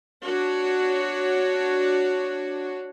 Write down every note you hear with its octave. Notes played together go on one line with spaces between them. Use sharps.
D4 F#4 C#5